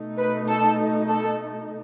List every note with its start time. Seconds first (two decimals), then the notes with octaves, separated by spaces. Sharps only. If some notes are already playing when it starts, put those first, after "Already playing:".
Already playing: B2 A3 D#4
0.17 B4
0.48 A4
1.09 A4